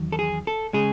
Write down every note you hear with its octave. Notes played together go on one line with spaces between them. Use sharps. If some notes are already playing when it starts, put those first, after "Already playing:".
Already playing: E2 D#3 F#3
A4
G#4
A4
C#3 G#3 G#4